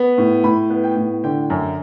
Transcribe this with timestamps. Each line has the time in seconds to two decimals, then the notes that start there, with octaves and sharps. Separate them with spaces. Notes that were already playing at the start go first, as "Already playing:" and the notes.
Already playing: B3
0.18 A2
0.44 A2 B5
0.70 B3
0.83 G5
0.96 A2
1.24 D3 G5
1.50 F#2